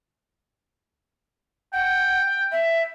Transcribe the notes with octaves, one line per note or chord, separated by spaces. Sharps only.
F#5 G5
E5